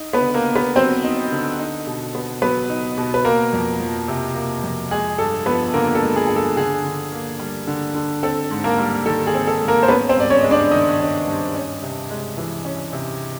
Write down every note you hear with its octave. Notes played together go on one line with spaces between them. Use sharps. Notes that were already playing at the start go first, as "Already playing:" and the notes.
Already playing: D#4
B3 B4
D3
A#3 A#4
A#3
B3 B4
F#3 C4 C5
D#4
D3
D#4
B2
B3
F#3 B3 B4
D#4
B2
B4
A#3 A#4
F2
F3
C3
A#3
F2
G#3 G#4
G2 A4
F3 B3 B4
D3 A#3 A#4
A4
G#3
G#4
G2 G#4
A4
D3 G#4
D3
A#3
G3
D3
D3
C4 A4
G#2
A#3 A#4
G3
D#3 A4
G#4
C4
A4
G#2
A#3 A#4
C5
B3 C#4 B4
C4 C5
G2 D5
C#4 C#5
G#3 D#5
D4 D5
D#3 D#4 D#5
C#4
G2
C#4
C3
G#3
E3
C#4
C3